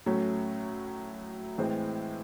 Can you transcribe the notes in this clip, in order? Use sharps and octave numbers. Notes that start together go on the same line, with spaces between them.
A2 F#3 A3 C#4
A2 E3 G#3 C4